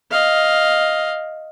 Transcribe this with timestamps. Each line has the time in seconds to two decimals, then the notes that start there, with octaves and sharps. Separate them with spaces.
0.11 D#5 F5